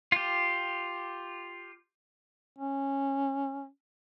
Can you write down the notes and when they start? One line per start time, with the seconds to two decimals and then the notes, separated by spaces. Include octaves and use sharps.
0.12 F4 G4
2.59 C#4